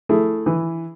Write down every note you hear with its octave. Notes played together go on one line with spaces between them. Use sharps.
A3 E4 G#4
E3